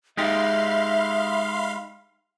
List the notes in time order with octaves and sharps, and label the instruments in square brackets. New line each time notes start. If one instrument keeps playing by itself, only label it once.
[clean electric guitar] G#3 D#4 G4 [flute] E5 [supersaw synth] F5 B5 C6